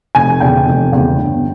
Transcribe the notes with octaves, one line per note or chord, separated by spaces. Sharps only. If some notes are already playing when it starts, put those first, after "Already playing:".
F1 G#5
E2 C#3 G5
F1
E2 C#3
G1